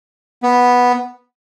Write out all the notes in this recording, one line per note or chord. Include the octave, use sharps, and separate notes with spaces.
B3